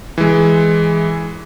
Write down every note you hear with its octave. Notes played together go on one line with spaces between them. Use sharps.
E3 G#3